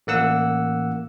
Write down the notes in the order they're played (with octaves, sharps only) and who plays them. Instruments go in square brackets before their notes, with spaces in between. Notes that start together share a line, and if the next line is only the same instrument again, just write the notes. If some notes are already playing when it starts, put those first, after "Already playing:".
[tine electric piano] A1 A#3 F#5 E6